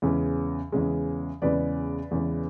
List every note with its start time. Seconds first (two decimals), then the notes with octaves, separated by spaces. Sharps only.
0.02 E2 C#3 G#3
0.72 E2 C#3 G#3
1.42 E2 C#3 G#3 B4 D5
2.11 E2 C#3 G#3